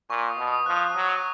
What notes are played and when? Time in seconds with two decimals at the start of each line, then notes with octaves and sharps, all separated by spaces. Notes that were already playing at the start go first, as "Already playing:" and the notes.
0.10 A#2 C#6
0.29 D#6
0.38 B2
0.48 D#6
0.66 F3 F#6
0.80 F#6
0.95 F#3 D#6
1.09 C#6